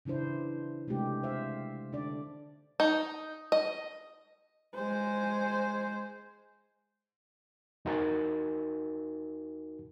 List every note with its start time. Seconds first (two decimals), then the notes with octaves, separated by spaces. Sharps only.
0.05 C#3 E3 D4 E4 C5
0.87 C3 G#3 A3 D4 G4
1.23 C5 E5 F5
1.92 D3 D4 D5
2.80 D#4
3.52 D#5
4.74 G#3 C5
7.85 E2 D#4 F#4 A#4 G#5 A6